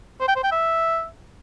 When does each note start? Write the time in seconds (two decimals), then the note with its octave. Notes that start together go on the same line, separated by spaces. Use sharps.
0.20 C5
0.28 G5
0.36 C5
0.44 G5
0.51 E5